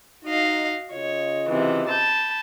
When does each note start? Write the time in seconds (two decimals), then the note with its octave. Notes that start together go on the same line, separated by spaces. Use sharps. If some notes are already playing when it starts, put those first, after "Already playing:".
0.24 D#4 F#4 D#5 F5
0.92 C#3 F4 C#5 D#5
1.49 C3 E3
1.88 A5 B5 G6